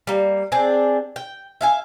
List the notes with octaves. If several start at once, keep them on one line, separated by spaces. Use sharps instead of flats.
G3 A#3
C4 D4 G#4 D5
G5
E5 F5 G#5